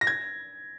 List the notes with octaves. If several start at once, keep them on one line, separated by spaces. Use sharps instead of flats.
A#6
G#6